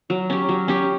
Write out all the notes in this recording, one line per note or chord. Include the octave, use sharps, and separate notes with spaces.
F#3
C#4 G4
F#3
C#4 G4